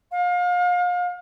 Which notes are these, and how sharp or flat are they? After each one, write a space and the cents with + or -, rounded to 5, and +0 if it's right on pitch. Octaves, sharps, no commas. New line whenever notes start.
F5 +35